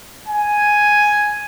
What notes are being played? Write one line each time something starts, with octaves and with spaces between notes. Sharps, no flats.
G#5